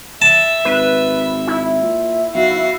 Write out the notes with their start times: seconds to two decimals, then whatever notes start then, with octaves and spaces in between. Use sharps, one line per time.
0.22 E5 A5
0.65 G#1 B4
1.48 E4
1.82 A#2
2.34 B1 F#4 F5